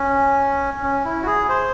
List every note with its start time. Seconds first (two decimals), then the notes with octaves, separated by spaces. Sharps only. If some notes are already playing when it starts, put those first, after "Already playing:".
Already playing: C#4
0.83 C#4
1.05 E4
1.22 F#4
1.27 G#4
1.49 C5